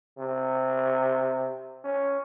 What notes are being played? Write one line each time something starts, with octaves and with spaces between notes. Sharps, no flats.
C3
C#4